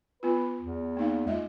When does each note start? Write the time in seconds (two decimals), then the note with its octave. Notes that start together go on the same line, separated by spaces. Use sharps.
0.23 B3 F4 B4
0.61 E2
0.97 A#3 D#4 F5
1.27 G#3 F4 D#5 E5